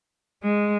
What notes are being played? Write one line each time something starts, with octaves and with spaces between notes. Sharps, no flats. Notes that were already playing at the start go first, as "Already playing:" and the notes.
G#3